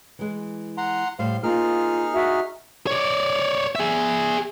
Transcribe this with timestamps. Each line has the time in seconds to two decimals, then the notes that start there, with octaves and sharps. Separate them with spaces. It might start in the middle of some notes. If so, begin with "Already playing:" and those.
0.19 E3 G#3
0.78 F#5 A#5 C6
1.19 A2 G3 C5 F5 C6
1.43 A#3 C4 D#4 F4 G#4 F6
2.13 F#4 E5
2.87 C#5 D5
3.75 G#4 E5